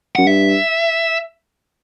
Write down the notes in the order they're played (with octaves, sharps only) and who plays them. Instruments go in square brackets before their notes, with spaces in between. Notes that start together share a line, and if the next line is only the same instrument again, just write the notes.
[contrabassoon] F#2 [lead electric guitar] F#5
[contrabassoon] G2 [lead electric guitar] E5